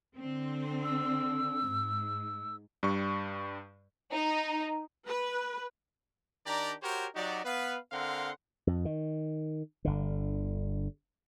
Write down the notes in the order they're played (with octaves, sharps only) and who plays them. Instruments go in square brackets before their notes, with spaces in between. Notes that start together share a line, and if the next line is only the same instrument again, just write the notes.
[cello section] D3 C4
[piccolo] E6
[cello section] G#2
[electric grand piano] G2 G3 C#6
[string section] D#4
[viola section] B4
[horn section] D#3 D4 G4 D5 A#5
F#4 G4 A#4 C5 C#5
F#3 D#4 F#4 G4 D5
B3 B4 F5
D3 C4 A#4 F5 F#5 C6
[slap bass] F2
D#3
G1 D3